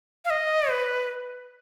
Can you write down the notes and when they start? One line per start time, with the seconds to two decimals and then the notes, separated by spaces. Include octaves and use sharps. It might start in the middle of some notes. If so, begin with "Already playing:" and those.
0.25 F5
0.30 D#5
0.71 B4